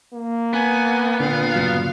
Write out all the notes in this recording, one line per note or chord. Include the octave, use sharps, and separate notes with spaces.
A#3
B3 G#5
A#2 D3 F5
G1 C#3 F#3